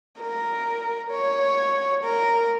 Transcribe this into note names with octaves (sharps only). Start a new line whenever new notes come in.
A#4
C#5
A#4